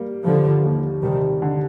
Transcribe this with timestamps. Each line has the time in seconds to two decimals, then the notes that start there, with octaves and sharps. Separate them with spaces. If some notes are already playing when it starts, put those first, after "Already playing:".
Already playing: G3 A#3
0.25 D3 F3 G3
0.64 D#2
1.03 C3 D#3 G3
1.42 D3